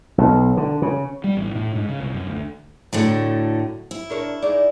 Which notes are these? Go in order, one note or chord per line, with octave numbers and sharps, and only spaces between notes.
B1
D3
C#3
G3
A1
A2
G#2
C#3
C2
F#2
D2
A2 D3 F#3 A3 A4
E4
D4 A#4 C#5
D#4 G#4 D5